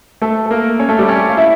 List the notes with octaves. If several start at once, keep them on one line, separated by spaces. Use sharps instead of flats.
A3 A4
A4
A#3 A#4
C#4 C#5
A3 A4
G3 G4
C#4 C#5
F5
E4 E5